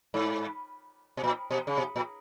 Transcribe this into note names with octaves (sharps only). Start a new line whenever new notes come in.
G#2
B2
A#2
B2
C#3
B2
A#2